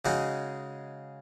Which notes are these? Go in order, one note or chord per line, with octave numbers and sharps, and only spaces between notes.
C#3 G#3 D#4 F#4